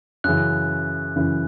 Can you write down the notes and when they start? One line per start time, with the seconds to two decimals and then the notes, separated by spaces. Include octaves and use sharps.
0.24 F#2 C#3 E3 F#6
1.16 F#2 C#3 E3